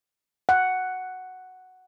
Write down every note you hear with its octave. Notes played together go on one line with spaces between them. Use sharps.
F#5